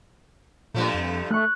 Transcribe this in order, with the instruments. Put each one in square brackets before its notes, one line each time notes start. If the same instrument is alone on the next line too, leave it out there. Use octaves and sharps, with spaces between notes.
[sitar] G2 F3 A3 [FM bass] A#2
[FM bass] F2
[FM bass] A3 [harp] C#6 F#6